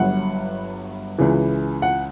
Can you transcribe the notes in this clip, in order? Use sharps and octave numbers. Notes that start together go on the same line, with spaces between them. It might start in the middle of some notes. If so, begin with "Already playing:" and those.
Already playing: G1 G2 F#3 F#5
C#2 C#3 E3
F#5